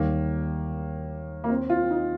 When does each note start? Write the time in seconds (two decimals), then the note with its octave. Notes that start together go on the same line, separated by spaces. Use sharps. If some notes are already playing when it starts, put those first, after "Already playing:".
Already playing: D#2 D#3 G3 A#3
1.44 A#3
1.50 C4
1.70 F4
1.91 D#4